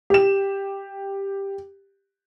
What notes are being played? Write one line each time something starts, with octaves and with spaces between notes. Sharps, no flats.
G4 E7